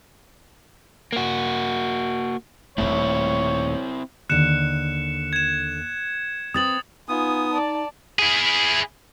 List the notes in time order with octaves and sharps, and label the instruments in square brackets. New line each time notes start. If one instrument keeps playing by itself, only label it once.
[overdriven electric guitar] A#3 F#4
[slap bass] D#1 C2 A3 [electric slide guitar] C4 E4 [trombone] C#5
[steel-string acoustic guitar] D#2 D3 [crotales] F#6 C#7 E7
[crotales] G#6 E7
[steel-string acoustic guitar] C4 B4 [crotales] D#6 A6 F#7
[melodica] B3 D#6 [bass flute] D#4 [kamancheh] F4 G#5
[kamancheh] D5 A5
[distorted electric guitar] E4 G#4